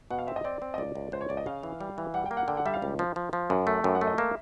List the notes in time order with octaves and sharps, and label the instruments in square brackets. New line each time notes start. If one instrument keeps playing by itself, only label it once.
[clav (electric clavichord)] B2 [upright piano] F#5
[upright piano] F5
[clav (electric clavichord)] C4 [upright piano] E5
[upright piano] D#5
[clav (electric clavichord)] C4 [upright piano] D5
[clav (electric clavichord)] C4
[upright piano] D#5
[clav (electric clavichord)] C#2 [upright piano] D5
[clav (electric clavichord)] C#2
[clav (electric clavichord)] C#2 [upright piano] C5
[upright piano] C#5
[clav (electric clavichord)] C#2 [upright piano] D5
[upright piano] D#5
[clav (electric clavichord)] C#3 [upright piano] F5
[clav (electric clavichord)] E3
G3
E3
[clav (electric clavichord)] G3 [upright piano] F#5
[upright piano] G5
[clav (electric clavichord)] A#3
[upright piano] F#5
[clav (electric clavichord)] D3 [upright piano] G5
[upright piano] F#5
[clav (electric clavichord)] G3 [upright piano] E5
[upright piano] F5
[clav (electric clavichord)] C#2
F3
F3
F3
[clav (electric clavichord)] F#2 [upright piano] F#5
[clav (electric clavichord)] A3
[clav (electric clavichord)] F#2 [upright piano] G5
[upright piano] F#5
[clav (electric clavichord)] A3
[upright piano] D#5
[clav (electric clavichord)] A#3 [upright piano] E5